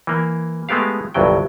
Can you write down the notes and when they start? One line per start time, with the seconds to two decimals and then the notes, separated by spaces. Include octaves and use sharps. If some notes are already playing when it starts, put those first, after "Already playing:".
0.07 E3 A#3
0.69 G#3 A3 B3 G4 F5
1.14 G1 C2 G2 F#3 G5